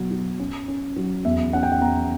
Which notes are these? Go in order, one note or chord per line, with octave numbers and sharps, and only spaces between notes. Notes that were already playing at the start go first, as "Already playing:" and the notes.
Already playing: B2 F#3
F#3
C#4
C#4
F#3
E2 E5
C#4 F#5
G5
F#5
E2 A#5